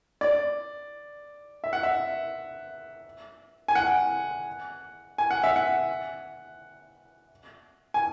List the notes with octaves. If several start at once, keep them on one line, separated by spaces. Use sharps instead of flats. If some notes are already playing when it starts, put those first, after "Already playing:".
D5
E5
F#5
E5
G#5
F#5
G#5
F#5
E5
F#5
G#5